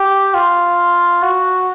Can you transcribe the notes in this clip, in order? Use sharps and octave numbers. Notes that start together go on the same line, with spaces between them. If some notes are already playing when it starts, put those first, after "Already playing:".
Already playing: G4
F4
F#4